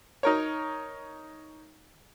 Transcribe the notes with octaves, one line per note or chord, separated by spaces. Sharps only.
D#4 A#4 C#5